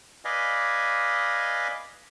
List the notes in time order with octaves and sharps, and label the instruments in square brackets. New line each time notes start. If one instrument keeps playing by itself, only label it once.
[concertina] B4 D5 D#5 F5 G#5